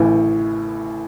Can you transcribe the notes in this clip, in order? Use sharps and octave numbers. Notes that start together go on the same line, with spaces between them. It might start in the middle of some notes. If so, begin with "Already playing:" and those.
Already playing: A1 A2 E3